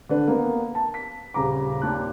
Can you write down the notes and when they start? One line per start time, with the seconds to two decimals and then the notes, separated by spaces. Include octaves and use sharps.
0.09 D3 D4 B4
0.27 A#3 B3
0.75 A5
0.94 B6
1.34 D#1 C#3 A#5 D6
1.82 D#2 A#2 A5 F#6